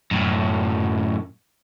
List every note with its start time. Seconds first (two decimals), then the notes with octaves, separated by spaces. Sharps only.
0.11 F#2 A2